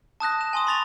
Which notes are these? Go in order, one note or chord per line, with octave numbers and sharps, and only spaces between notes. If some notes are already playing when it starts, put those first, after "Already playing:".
A5 D#6 F#6 A#6
E7
G#5 C6 D#6
B5 C#6 A6 A#6 F7